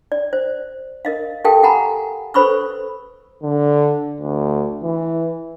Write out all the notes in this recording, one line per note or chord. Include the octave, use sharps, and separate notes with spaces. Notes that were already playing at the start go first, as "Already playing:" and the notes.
D5
C5
A#4 D#5 F5
G4 A4 A#4 F5 G5 A5
G#4 F#5 G#5 A#5 B5
A4 B4 C5 B5 C#6 E6
D3
D2
E3